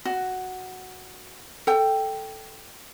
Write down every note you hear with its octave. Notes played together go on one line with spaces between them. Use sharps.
F#4
A4 G5